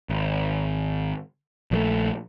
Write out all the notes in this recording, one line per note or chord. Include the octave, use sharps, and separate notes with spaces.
G#1
A#1 F3 A3